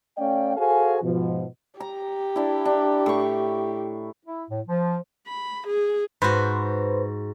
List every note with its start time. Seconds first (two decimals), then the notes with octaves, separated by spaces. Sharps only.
0.18 A3 C#4 D5 F5 G5
0.57 F#4 G#4 A4 C5 F5 G#5
1.03 G#2 B2 F3
1.80 G4 A#5
2.36 D4 E4
2.65 D4
3.06 A2 C#6
4.26 E4
4.50 A2
4.67 F3
5.27 B5
5.67 G#4
6.22 G#2 F#4 B4 C5